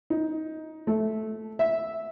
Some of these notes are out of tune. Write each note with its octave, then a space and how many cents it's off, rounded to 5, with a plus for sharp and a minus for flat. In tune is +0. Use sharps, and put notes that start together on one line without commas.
D#4 +15
A3 -10
E5 -5